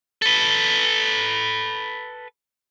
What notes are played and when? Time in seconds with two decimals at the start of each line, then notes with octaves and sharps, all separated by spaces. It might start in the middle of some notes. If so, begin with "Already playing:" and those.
0.22 A4 B4